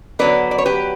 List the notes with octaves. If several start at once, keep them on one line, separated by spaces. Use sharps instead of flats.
D3 F#3 B3 B4 D5
D5
C#5
G4 B4